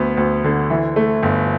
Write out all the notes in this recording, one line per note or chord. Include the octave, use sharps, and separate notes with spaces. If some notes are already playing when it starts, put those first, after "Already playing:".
Already playing: D2 B3
D2
D3
E3
A3
G1